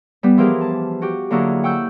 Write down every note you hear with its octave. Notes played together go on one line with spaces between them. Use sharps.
G3 B3
E3 F3 G4 G#4 A#4
A5
F#4 G4
D3 F#3 A#3 E4 F#4 G#4
F#5 G5 C#6 E6 G6